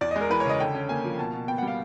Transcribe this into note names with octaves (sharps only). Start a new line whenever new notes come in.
E2 D5
D#5
G#3
A#4
E3 B4
C#5
C#3 D#5
D3 G5
C#4
A#3 G#5
F3
B2 A5
B2
B3 G5
F#5
G3 F5